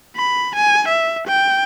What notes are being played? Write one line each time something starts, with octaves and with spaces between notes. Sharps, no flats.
B5
G#5
E5
G5